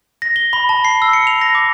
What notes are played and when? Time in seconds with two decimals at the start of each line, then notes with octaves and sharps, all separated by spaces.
0.22 A#6
0.36 G7
0.53 B5
0.69 A5
0.85 C7
1.02 E6
1.13 C#7
1.27 F7
1.41 A#6
1.55 D6